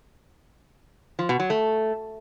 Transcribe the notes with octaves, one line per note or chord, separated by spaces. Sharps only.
F3
B2
F#3
A3